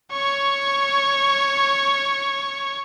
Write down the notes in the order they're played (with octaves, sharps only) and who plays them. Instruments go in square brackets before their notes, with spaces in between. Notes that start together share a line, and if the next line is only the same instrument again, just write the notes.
[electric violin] C#5 C#6